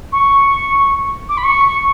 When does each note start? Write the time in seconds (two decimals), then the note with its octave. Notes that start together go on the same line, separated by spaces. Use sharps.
0.12 C#6
1.29 D6
1.37 B5
1.44 C#6